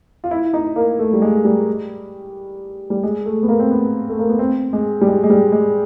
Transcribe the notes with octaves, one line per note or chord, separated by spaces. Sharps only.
F4
E4
D#4
A#3
A3
G3
G#3
G3
G3
G#3
A3
B3
A#3
C4
B3
A3
A#3
B3
C4
G#3
G3
G#3
G#3
G3
G#3